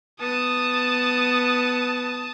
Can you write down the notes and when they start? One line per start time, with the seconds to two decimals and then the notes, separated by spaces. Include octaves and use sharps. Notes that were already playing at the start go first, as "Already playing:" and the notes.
0.21 B3 A5 D#6